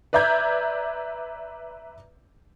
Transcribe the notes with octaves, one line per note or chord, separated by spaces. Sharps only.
B4 D5 E5 A#5 G6 G#6